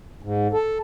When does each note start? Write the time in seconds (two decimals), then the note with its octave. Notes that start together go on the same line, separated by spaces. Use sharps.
0.23 G#2
0.52 A4